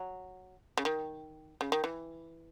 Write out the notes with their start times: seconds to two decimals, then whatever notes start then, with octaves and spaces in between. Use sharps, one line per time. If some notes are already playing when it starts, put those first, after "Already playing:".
Already playing: F#3
0.77 C#3
0.85 D#3
1.61 C#3
1.72 D#3
1.84 E3